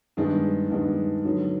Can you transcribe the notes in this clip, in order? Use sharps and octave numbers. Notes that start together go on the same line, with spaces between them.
G2 D#3 G#3 B3 D4
G2 D#3 G#3 B3 D4
D3 F#3 B3 D#4